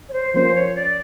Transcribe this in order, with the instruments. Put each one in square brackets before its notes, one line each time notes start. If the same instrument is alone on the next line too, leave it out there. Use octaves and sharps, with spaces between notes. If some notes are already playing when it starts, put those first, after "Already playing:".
[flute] C#5
C5
[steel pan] F3 A#3 C#4 [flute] C5
[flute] C#5
D5